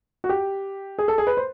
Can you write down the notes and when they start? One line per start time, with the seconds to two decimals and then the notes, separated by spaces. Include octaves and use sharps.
0.24 F#4
0.29 G4
0.99 G#4
1.08 A4
1.18 G#4
1.27 B4
1.37 C5